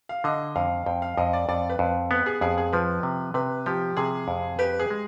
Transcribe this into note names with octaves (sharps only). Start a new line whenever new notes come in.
F5
D3 D#5
F2 F5
F2 G5
F5
F2 D#5
D5
F2 D5
B4
F2
B3 B4
G#4
F2 G#4
G#4
F3 B4
C3
C3 B4
F3 G4
C3 G#4
F2
G4 B4
G#4
G#3